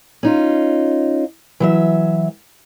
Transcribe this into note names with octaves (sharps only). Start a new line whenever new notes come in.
C#4 D#4 F4
E3 F#3 E5